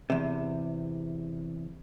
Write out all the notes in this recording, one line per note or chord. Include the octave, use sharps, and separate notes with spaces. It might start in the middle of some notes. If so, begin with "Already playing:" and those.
E2 C3